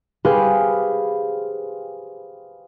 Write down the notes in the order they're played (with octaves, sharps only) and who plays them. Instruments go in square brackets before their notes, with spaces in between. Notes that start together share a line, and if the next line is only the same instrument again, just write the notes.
[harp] G4 G#4 B4 C5 F5